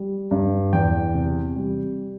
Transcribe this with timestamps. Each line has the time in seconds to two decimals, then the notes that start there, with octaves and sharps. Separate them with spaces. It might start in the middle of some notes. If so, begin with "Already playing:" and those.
Already playing: G3
0.31 G2
0.73 E2 G5
1.14 C3
1.56 G3